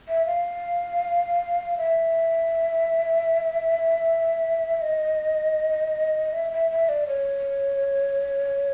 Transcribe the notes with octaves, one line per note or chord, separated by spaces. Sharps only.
E5
F5
E5
D#5
E5
E5
E5
D5
C#5